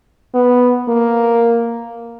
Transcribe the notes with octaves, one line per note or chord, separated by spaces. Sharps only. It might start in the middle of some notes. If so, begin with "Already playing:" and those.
B3
A#3